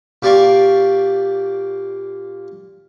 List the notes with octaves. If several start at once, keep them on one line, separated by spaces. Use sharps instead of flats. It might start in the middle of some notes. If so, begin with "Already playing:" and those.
A#2 G4 D5 F5 C#6